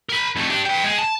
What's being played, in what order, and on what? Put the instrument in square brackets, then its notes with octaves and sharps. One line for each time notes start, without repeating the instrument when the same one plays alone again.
[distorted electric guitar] A#4 B5
F2 A3
D4 G4
B4 G5
G#3 G#4
A5